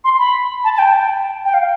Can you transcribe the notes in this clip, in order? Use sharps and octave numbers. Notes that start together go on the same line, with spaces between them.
C6
B5
A5
A5
G5
G5
F5